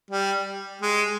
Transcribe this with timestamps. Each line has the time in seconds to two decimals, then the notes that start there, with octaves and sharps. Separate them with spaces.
0.10 G3
0.82 G#3